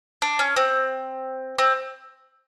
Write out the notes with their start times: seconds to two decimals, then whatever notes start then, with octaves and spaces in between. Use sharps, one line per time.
0.22 D4
0.39 C#4
0.56 C4
1.58 C4